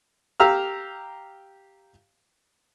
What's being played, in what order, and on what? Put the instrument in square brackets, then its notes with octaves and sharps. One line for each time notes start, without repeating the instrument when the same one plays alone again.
[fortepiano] G4 F5 A#5 E6 F6